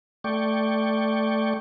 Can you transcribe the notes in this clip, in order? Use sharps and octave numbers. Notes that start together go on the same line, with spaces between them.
A3 D5 G5 C#6